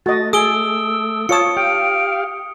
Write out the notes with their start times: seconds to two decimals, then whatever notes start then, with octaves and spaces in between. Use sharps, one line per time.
0.06 A3 F#4 D#5 A6
0.33 G#4 D#6 E6 D7 G7
1.29 F4 C#5 A5 D#6 C#7
1.57 G4 F5 G5 D7